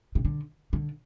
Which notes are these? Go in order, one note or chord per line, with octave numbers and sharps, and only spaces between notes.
C3
D3
D3